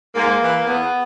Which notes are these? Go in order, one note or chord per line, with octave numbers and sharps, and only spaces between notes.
G#2 A#3
E3
E2 B3